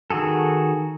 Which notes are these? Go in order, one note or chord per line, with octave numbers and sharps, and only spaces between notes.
D#3 F#4 G#4 A4